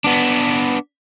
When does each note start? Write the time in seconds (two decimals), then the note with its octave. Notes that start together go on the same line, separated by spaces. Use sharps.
0.04 B3 D4